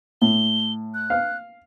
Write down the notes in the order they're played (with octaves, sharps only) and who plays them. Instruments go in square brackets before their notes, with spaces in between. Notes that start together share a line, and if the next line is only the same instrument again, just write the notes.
[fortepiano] A2 [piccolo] G7
[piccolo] F#6
[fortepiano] F5